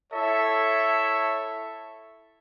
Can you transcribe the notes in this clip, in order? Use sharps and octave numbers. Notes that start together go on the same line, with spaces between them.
E4 A4 C#5 E5